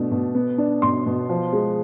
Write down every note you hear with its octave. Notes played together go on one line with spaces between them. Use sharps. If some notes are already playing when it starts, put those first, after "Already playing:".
Already playing: B2 A3 D4
B2
B3
D4
B2 C6
B2
F3
G#3